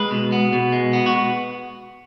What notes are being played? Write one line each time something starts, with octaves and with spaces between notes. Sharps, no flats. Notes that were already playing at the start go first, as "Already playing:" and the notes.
Already playing: G#3 B4
B2
B3
B2
G#3
B3
F#4